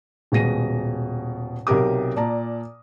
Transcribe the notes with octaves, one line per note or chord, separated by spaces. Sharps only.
D#1 B2 G#3 A#6 D#7
B1 C3 G4 A#4 D6 D#6
A#2 D5 A5 A#5